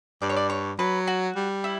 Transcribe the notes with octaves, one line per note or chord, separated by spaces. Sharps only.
G2 D5
C#5
D5
C#5
F#3 B4
F#4
G3
E4